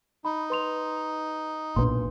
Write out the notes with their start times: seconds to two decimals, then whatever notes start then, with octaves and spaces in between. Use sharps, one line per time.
0.25 D#4 B5
0.50 B4 C6 F7
1.76 B1 A#2 D4 B4 C6